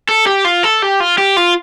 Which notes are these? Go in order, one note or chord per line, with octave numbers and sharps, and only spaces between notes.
A4
G4
F4
A4
G4
F4
G4
F4